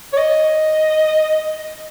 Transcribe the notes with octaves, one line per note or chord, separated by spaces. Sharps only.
C#5
D#5